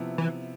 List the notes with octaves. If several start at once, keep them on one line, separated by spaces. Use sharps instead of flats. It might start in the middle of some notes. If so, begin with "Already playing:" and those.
Already playing: C3 F3 B3 E4
E3